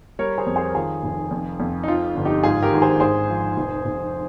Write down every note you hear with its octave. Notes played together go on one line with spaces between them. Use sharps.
G3 A#4 C#5
G#4 C5
F2
G#4 C5
A#4
D#3 F4 G#4
F1
F2
F2
D#4
F3 F4
G1
D#4 G4
G#2 F4 G#4
G4 A#4
G#1
G#4 C5
G#2 G#4 C5
F3
F1
F1